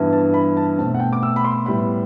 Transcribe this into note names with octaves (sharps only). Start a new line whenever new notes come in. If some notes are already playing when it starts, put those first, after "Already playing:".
Already playing: G2 E3 B3
A5
B5
A5
B2 A3 C4 A5
F#5
G5
D6
E6
B5
C6
A2 G3 B3 B5